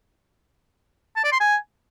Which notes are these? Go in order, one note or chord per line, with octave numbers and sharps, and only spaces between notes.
A5
D5
C6
G#5